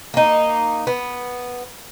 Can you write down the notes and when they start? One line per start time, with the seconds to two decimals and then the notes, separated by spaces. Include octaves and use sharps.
0.14 A#3 D#4
0.87 B3